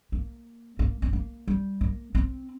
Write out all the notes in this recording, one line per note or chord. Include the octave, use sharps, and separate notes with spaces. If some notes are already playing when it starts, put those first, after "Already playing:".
A#3
A#3
C4
A#3
G3
A#3
C4